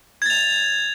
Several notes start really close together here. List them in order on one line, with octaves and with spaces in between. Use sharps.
G#6 A6 F7